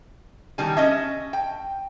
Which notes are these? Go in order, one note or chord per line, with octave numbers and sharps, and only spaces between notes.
B2 D#3 G3 G#5
C#4 D#5 E5
G5